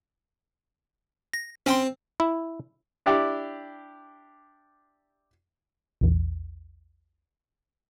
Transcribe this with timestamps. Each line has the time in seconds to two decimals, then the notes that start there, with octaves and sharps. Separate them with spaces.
1.33 A#6
1.66 C4 C#4 G5 C6
2.20 E4
3.06 D4 E4 G4 D5
6.01 A#1 E2